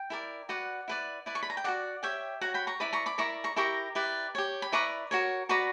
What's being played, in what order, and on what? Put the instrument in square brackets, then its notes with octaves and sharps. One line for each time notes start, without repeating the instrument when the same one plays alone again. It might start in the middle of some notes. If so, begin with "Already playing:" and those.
Already playing: [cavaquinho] G5
E4 A#4 D5
F#4 B4 D5 F#5
E4 B4 D5
E4 B4 D5
C#6
B5
A#5
G5
F#4 A#4 D5 F#5
G4 C#5 E5 G5
F#4 C#5 F#5 A#5
G5 B5
A#5 C#6
E4 B4 D5 B5 D6
A#5 C#6
B5 D6
E4 A#4 D5 A#5 C#6
A#5 C#6
E4 G4 A#4 A#5 C#6
E4 G4 B4 D5
G4 C#5
B5
E4 B4 D5 A#5 C#6
F#4 A#4 C#5
F#4 B4 D5 A#5 C#6